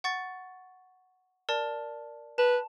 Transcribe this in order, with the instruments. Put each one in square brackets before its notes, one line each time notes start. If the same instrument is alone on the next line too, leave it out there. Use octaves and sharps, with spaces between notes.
[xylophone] F#5 C#6 A6
A#4 D5 A5
[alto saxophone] B4 [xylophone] A5